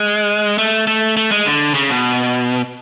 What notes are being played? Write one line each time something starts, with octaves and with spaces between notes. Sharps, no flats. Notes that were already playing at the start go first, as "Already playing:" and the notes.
Already playing: G#3
A3
A3
A3
G#3
D3
C#3
B2